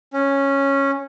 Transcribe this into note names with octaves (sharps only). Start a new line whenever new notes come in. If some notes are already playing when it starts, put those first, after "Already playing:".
C#4